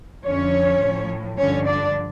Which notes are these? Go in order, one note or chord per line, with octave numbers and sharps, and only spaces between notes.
F2 D3 F3 C#4 C#5
A2 F3
G2 D3 F3 C#4 C#5
D4 D5